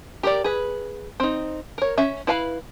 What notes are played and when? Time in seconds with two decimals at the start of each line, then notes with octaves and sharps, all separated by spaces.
0.23 G4 A#4 D5
0.44 G#4 B4
1.20 C4 D#4
1.78 A#4 C#5
1.98 C#4 E5
2.27 E4 B4 F5 A5 B5